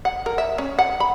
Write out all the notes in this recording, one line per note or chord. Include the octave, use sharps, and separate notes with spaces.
F#5
A#4
E5
C#4
F#5
B5